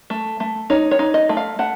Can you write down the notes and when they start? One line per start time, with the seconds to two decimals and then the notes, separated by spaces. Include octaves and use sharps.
0.10 A3
0.40 A3
0.70 D#4 C#5
0.91 C#5
0.99 D#4
1.14 D#5
1.29 A3
1.37 F5
1.59 A3 F#5